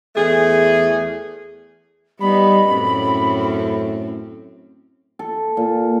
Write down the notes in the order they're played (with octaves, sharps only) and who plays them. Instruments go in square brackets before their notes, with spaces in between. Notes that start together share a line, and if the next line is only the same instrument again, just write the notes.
[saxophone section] E2 A3 G#4
[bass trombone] G3 [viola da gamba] B3 D#4 [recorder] B5
[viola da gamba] F#2 C4 C#4 [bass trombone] A2
[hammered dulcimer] A4
A#2